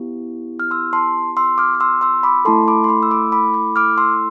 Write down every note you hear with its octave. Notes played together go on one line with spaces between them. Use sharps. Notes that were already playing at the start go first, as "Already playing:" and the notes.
Already playing: B3 E4 G4
F6
C6 E6
A5 C6
C6 E6
D6 F6
D6
C6 E6
C6 E6
B5 D6
A3 E4 A4 A5 C6
B5 D6
C6
B5 D6
E6
B5 D6
B5 D6
B5 D6
D6 F6
C6 E6